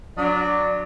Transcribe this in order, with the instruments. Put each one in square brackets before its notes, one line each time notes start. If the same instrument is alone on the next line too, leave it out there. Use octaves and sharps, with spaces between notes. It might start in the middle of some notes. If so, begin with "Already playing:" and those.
[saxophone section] F#3 D4 [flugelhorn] D5